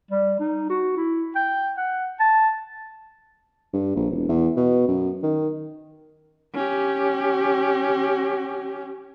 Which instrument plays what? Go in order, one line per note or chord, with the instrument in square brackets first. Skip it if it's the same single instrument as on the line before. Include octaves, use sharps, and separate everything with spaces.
[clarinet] G3
D#4
F#4
E4
G5
F#5
A5
[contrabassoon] G2
A#1
E1
E2
B2
F#2
D#3
[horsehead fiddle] C#4 G4